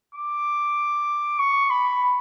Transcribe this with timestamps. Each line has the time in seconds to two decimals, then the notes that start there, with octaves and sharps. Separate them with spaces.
0.15 D6
1.39 C#6
1.70 B5